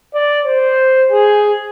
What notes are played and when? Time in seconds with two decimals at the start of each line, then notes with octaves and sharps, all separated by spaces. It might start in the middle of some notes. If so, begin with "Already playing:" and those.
0.14 D5
0.46 C5
1.11 G#4